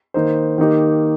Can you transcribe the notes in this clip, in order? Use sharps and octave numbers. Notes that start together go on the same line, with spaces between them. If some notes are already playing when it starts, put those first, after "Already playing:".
D#3 A#3 D#4 C5
D#3 A#3 D#4 G4